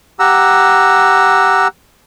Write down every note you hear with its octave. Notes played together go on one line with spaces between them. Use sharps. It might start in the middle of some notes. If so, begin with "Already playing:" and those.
G4 F#5 A#5 E6